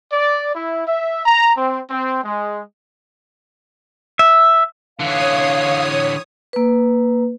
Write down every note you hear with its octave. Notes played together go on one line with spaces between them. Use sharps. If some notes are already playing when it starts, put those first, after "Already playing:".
D5
E4
E5
A#5
C4
C4
G#3
E5
D3 E3 C#5 F5 D#6
A#3 B4